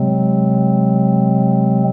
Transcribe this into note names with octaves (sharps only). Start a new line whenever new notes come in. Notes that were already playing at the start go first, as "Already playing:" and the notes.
Already playing: C3 F#3 G#3 C4